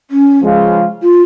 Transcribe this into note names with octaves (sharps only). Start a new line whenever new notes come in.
C#4
C#3 F3 G#3 C#4 F4
F4